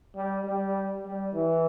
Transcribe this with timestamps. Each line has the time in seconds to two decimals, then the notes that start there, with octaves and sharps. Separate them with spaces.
0.16 G3
0.45 G3
1.05 G3
1.34 E3